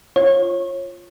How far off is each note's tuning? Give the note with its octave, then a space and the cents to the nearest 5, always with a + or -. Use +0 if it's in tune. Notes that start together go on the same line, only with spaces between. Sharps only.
F4 +0 C#5 -25